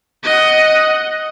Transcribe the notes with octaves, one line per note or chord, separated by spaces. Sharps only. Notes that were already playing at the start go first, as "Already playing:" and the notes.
D#5 F#5